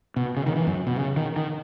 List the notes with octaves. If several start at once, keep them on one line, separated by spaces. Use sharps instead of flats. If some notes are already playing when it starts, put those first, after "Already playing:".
B2
C#3
D#3
E3
F#2
B2
C#3
D#3
D#3